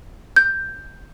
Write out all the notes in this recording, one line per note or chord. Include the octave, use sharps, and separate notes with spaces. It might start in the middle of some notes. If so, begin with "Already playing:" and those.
G6